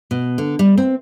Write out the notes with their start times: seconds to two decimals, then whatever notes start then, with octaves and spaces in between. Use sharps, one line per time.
0.11 B2
0.38 D3
0.59 G3
0.77 C4